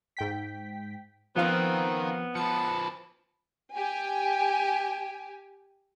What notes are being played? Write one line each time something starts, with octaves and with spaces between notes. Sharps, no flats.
G#2 G5 B6
D#3 F3 B3 C4 D#4 F5
F3 B4 A5 C#7
G4 G#5